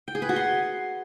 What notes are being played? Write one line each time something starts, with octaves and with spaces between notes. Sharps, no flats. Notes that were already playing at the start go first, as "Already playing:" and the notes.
G5
G#4
B4
F#4
C6